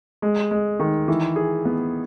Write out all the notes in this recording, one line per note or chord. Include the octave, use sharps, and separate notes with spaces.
G#3
G#3
D#3
E3
G#4
B3